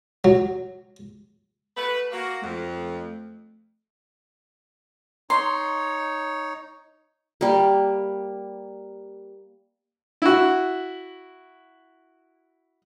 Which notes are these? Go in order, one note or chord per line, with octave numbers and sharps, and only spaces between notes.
F#3
A3 F#4 B4
A#3 F#4
F2 A3
D#4 C#5 C6
G3 A#3
E4 F#4